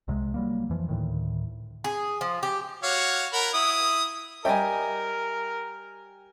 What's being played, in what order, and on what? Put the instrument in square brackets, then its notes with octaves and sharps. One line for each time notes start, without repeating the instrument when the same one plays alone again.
[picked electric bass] C2 C3 G3 G#3
F#3 G3 A#3
F2 E3 F3
D2 A2 D#3
[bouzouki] G#4
F3
G4
[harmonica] F#4 C#5 F5
A#4 F#5 B5
E4 D#6
[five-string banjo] G3 D#5 E5 [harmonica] A#4 [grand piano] G5 G#5